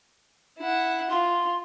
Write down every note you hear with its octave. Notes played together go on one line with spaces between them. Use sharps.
E4 F#5
F4 C6